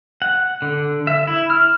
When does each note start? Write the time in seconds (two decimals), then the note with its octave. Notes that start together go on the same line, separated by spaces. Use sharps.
0.22 F#5
0.62 D3
1.07 E5
1.27 E4
1.50 F6